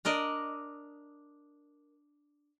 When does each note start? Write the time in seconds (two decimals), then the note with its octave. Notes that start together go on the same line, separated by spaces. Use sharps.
0.05 D4 A#4 D5 D#5